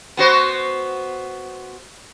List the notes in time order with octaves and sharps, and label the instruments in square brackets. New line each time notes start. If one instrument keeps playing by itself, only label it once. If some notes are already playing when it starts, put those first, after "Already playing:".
[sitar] B3 F#4 C5